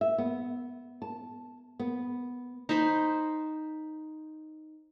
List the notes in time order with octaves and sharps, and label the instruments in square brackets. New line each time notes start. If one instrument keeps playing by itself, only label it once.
[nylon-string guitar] E5
B3
A5
B3
[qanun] D#4 C5 B5 C6